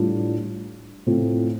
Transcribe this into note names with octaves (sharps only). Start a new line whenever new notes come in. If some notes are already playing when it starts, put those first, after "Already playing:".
Already playing: A2 G3 D4 F4
A2 A3 C4 F4